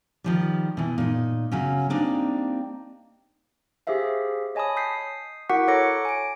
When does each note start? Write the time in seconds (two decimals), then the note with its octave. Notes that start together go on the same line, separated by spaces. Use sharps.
0.24 D#3 F3 G3
0.77 B2 E3
0.98 A#2 D#4
1.51 C#3 F#3 C#4
1.90 G3 A#3 C4 D4 D#4
3.87 G4 G#4 C5 E5 F5
4.55 C#5 D#5 G#5 A5 B5 D#6
4.77 D#6 G6 B6 C7
5.49 E4 F#4 A#4 F#5 D6 B6
5.68 A4 C#5 A#5 D6 A#6 C#7
6.05 G#5 D7